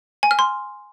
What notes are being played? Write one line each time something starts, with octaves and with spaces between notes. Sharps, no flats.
G#5
F6
C6